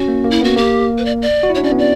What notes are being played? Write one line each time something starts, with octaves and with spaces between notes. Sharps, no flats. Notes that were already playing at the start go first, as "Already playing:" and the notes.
Already playing: C#4 F#4
A#3
A#3
E4
B3 F#4
A#3 G4
B4
D5
D5
F#4
E4
D4 C#5
C#4 D5
B3
D5